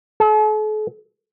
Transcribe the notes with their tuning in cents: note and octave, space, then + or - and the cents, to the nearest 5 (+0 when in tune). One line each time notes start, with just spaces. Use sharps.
A4 -45